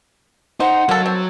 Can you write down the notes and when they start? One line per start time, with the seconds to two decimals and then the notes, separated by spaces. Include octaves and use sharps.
0.60 D#4 C5 F#5
0.89 F#3 A#3 A4
1.06 C4